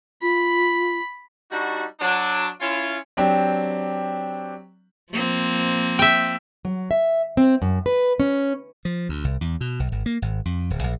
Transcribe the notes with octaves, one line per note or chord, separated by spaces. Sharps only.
F4 B5
G3 D4 D#4 F#4
F#3 D4
C#4 E4 F4
F#3 C4 D4 G4
F3 A#3 C4
E5 G5
F#3
E5
C4
F#2
B4
C#4
F3
D2
C2
E2
B2
B1
G#1
A#3
G#1
F2
D1
A#1